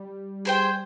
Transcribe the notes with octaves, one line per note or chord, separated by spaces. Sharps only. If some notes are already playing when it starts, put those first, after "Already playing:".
Already playing: G3
G#4 C5 G5